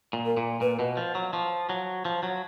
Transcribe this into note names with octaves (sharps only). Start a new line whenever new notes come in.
A#2
A#4
A#2
A#2 B4
B2
F3
F#3
F3
F#3
F3
F#3